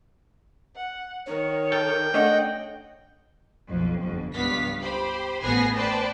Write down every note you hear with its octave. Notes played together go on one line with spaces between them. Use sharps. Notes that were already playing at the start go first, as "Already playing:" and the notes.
F#5
D#3 C#5
A4 G5
A3 C#4 D4 D#5 F#5
B1 F2
G1 F2
C#2 G2 B3 F5 B6
G4 C5 B5
A1 B3 G#4 G#5 A#6 C7
B4 C5 D5 G5 A5